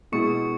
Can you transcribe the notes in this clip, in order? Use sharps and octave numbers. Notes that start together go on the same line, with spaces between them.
B2 G#3 E4 C#6 C#7